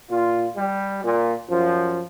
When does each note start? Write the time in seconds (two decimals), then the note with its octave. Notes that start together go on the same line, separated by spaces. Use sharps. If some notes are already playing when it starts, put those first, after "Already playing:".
0.10 A#2 F4
0.56 G3
1.03 A#2
1.49 F#2 F3